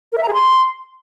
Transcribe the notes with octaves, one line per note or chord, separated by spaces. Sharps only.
A#4
E5
A#5
G#4
C6